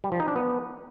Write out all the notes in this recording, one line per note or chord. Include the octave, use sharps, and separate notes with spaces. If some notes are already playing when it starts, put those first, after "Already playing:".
G3
F3
D#4
D4
B3